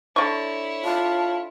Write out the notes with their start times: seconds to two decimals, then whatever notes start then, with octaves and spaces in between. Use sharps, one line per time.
0.16 D3 E4 C#5 C#6
0.85 F4 A5